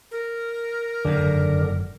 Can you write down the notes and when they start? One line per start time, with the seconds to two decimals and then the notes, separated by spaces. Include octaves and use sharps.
0.11 A#4
1.05 F#1 F2 G#2 D3